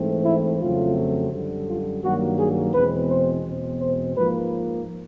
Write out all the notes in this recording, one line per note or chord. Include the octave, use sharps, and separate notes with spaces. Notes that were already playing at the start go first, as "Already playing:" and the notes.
Already playing: G#2 E3 A3 C4
E4
F2 C#3 F#3 A3 C4 F4
F#2 D3 G3
F4
G2 D#3 F#3 A#3 F#4
G#4
E2 B2 G#3 C4 B4
C5
E2 B2 G#3 C4
C5
G#2 F3 A#3 B4